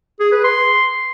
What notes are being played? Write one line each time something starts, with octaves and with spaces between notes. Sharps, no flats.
G#4
B4
C6